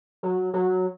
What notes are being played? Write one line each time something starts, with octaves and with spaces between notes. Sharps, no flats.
F#3
F#3